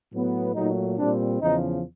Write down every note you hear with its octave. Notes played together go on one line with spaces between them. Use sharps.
A2 F#3 B3
A#2 F#3 A3 D#4
A#2 G3 C4 D4
E2 C#3 F3 D#4